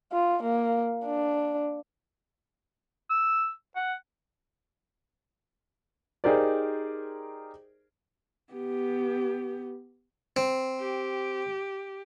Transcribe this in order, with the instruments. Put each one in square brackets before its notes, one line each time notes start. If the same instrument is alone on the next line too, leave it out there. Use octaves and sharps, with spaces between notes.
[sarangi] F4
A#3
D4
[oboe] E6
F#5
[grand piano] D#4 G4 G#4 A#4 C5 D5
[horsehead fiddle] B3 G4
[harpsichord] C4
[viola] G4